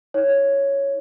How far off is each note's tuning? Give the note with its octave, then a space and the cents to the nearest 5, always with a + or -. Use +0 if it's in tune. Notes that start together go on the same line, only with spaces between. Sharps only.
D#4 +45 C#5 +0